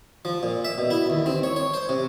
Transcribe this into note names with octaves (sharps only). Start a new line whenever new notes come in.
F3
A#2
E5
B2
E4
D#2
C4
C#5
C#5
C5
C3